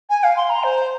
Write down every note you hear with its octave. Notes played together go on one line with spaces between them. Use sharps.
G#5
F5
C6
A#5
C5